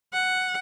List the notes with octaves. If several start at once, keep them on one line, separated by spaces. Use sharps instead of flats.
F#5